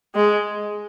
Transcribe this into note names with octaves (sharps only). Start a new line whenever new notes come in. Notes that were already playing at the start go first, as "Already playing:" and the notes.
G#3